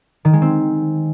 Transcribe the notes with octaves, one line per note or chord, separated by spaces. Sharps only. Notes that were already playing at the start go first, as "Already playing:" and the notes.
D#3
G#3
C4